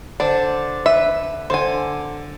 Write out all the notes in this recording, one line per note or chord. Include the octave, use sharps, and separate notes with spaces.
D3 D4 C5 D5
B4 E5
D3 C5 G#5